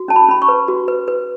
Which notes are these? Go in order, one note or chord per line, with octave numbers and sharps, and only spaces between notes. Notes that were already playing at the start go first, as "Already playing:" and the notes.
Already playing: F#4
C#4 A5
B5
C#4 B5
C#6
B4
F#4
B4
B4